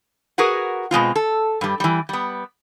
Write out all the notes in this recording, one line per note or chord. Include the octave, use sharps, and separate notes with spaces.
F#4 G#4 A#4 B4 F#5
B2 G#3 C4 F4
A4
G2 G3
E3 G3
G3 B3